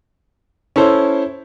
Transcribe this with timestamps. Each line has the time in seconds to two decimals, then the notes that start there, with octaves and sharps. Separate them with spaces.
0.76 C#4 E4 A4 C5